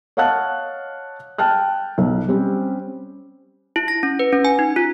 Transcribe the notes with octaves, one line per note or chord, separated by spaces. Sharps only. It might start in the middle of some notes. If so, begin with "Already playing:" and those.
C#5 D#5 F5 F#5 A5 F#6
G5 A5 F6 F#6
B1
G3 C4 C#4 G4
E4
A#6
C#4
B4
C#4
G#5
D#4
F4